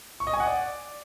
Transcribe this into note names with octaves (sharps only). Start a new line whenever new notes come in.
C#6
D#5
G#5
F#5
D5